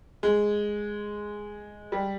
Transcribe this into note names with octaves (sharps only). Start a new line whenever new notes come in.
G#3
G3